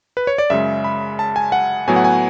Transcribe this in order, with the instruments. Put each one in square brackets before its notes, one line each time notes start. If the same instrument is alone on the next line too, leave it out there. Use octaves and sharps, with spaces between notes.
[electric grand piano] B4
C#5
D5
F#2 C#3 G#3 E5
B5
A5
G#5
F#5
A2 F#3 B3 G#5
F#5
G#5